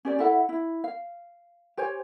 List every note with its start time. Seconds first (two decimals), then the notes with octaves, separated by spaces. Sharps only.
0.05 C#4 G4 D5
0.19 E4 A4 E5 F#5
0.49 E4
0.84 F5
1.77 G4 C5 C#5 G#5